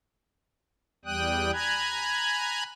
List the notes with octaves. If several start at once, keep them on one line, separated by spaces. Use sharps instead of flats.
E2 G3 G5 D#6 F#6
G#5 A#5 B5 F#6 G#6